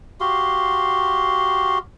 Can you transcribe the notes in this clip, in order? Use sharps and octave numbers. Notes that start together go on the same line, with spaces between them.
F#4 G4 F5 C6